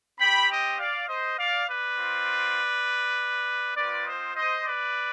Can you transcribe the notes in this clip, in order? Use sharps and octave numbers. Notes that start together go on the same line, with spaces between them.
C4 G4 G5 B5
D#5 G5
D5 F5
C5 D#5
D5 F5
B4 D5
C4 F4
C4 F4 B4 D5
C5 D#5
C5 D#5
B4 D5